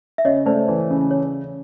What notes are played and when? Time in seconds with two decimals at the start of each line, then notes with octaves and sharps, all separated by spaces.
0.18 E5
0.25 C#3 C#5 D#5
0.46 A3 C5 D5
0.68 E3
0.90 C#3
1.11 C#5